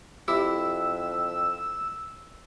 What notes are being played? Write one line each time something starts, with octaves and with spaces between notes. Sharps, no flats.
F2 E4 G4 E6